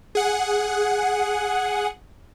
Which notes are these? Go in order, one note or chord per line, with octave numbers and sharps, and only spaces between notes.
G#4 F#5